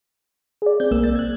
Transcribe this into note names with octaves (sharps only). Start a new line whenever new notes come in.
G#4 D5
C4 G6
B1 A#3 E6
A6
F#6 G#6